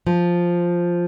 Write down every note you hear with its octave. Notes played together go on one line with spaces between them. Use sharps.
F3